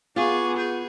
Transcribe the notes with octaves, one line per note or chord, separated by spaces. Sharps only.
B3 F4 G#4 G#5 C#6 D6
G#4 G6